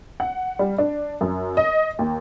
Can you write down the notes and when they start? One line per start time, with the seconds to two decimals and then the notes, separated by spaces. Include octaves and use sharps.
0.20 F#5
0.59 G3
0.78 D4
1.21 F#2
1.57 D#5
1.99 D#2